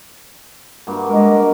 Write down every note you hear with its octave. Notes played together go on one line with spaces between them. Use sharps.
G2 A#3 F#4
G#3 A#4